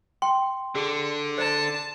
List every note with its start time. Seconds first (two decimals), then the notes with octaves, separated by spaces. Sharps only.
0.22 G5 C6
0.75 D3 G#4
1.38 C5 D5 A5